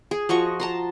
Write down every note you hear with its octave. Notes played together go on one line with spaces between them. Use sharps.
G#4
F3 F#4 D#5 C#6
A5 A#5 C6